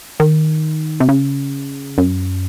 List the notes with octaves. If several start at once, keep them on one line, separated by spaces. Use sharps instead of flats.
D#3
C3
C#3
F#2